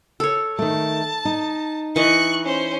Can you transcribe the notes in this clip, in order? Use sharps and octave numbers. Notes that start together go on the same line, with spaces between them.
A4 C#5
D#3 A3 A5
D#4
E3 D#5 C#6 F#6
C#4 C5